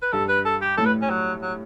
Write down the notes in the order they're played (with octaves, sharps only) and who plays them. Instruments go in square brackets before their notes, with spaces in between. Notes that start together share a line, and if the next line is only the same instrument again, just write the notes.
[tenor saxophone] B4
[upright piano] G2 [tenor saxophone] A4
[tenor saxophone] B4
A4
G4
[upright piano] A2 [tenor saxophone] A4
[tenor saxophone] B4
C#4
F#3
F#3